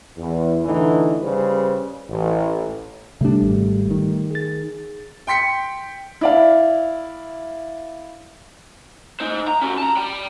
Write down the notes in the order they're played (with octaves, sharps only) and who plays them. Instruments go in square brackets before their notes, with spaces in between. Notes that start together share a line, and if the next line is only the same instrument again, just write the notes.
[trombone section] E2
A2 D3 E3 D#4
C#3 G3 B4 C5
A1
[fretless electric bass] C3 D4 [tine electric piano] G3 A3 G4
[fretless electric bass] G#1
D#3
[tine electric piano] G#4 A6
[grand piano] G5 C6 B6 C#7
[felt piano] E4 D5 F5
[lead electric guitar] D#4 C5
A#5
C#4 F#4
A5 A#5
G5 B5